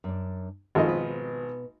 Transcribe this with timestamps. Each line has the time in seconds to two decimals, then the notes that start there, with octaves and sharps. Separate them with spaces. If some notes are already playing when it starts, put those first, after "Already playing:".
0.04 F#2 D4
0.75 G#1 F3 F4 A4 A#4 D#5
0.88 B2 B4